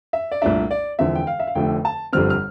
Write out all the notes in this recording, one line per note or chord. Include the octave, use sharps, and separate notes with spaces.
E5
D5
C2 A#2 A3 D4 E5
D5
E1 E2 D3 F3 C4 E5
G5
F5
E5
F5
F1 F2 D3 A3 G5
A5
G1 F2 D3 G3 C4 F6
F6